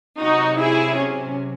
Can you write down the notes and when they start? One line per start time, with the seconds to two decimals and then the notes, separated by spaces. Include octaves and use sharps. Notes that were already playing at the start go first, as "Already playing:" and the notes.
0.21 C3 F#3 D#4 F#4
0.60 E4 G#4
0.99 C#4